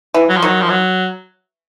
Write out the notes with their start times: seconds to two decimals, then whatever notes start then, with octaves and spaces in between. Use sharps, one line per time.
0.14 E3
0.29 F#3
0.37 F3
0.42 D#3 F#3
0.62 F3
0.70 F#3